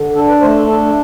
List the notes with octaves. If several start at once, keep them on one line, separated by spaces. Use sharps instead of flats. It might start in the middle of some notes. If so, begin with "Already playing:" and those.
Already playing: D3
D4 A4
B4
A3 C5
A4
D4 A4